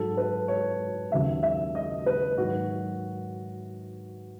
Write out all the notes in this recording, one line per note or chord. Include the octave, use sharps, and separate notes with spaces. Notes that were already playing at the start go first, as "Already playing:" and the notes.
Already playing: G#2 F#3 A4
B4
C#5
D#2 C#3 F#3 E5
E5
D#5
B4
G#2 D#3 F#3 F#4